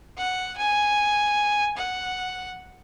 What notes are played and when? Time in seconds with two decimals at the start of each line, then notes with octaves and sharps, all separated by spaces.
0.18 F#5
0.57 G#5
1.77 F#5